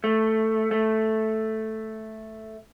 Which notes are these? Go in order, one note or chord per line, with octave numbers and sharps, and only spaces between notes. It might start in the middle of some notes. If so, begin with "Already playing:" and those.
A3
A3